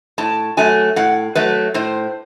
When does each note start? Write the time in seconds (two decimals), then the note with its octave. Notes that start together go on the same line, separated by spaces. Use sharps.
0.18 A2 A5
0.57 F#3 A3 G#5
0.96 A2 F#5
1.35 F#3 A3 B4
1.74 A2 C5